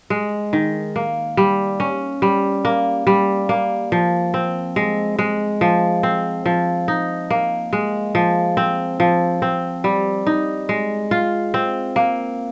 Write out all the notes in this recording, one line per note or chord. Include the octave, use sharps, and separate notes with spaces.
G#3
D#3
A#3
G3
C#4
G3
A#3
G3
A#3
F3
C4
G#3
G#3
F3
C4
F3
D#4
A#3
G#3
F3
C4
F3
C4
G3
D#4
G#3
F4
C4
A#3